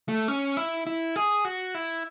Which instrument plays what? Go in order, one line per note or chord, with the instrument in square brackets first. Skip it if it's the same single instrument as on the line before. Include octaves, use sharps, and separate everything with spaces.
[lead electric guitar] A3
C#4
E4
E4
G#4
F#4
E4